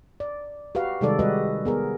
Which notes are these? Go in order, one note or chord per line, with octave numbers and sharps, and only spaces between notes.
D5
F#4 G4 B4 F5
C3 D#3 G3 G#3 A4 D5
G3 G#3 F#4 G4 B4 D#5
B3 G#4 A#4